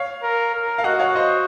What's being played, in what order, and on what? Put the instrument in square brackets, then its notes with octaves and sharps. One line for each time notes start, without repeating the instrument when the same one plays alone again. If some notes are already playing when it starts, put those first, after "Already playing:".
Already playing: [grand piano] C#5 F5
[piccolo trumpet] A#4
A#4
[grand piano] F5
[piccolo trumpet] F#4 [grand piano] D#5 F#5
[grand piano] C#5 F5
C5 D#5